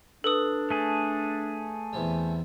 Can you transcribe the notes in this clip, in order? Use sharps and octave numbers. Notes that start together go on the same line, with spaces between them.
D4 A4 B4 D#6
A3 G#4
E2 C3 G3